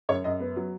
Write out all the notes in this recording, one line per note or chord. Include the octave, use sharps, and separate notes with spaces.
F#2 C#5
F#2 D#5
B3
F#3